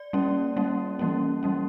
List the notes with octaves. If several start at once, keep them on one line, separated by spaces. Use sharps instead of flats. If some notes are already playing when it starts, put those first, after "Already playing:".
Already playing: D5
G3 A#3 C#4
G3 A#3 C#4
E3 G3 A#3 C#4
E3 G3 A#3 C#4